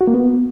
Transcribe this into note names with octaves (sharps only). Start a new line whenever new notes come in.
F#4
A#3
B3